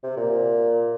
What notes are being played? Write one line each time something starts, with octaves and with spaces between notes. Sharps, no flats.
C3
A#2